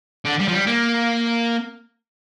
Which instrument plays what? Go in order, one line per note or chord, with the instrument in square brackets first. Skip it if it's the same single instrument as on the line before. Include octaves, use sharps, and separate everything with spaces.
[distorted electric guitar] D3
G3
F3
G3
A#3